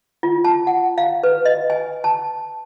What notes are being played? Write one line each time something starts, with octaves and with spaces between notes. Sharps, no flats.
F4
A5
F#5
F5
B4
D#5
G#5
A5